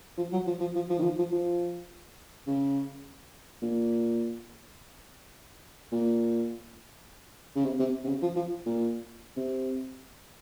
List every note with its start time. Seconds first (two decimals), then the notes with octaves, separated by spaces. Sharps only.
0.18 F3
0.32 F#3
0.47 F3
0.60 F3
0.76 F3
0.90 F3
0.99 D#3
1.03 F3
1.19 F3
1.32 F3
2.47 C#3
3.62 A#2
5.92 A#2
7.56 C#3
7.65 C3
7.79 C3
8.04 C3
8.08 C#3
8.22 F3
8.36 F3
8.66 A#2
9.37 C3